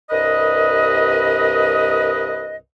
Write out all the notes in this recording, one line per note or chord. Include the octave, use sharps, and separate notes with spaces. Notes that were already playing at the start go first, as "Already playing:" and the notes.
C2 G2 A#4 B4 D#5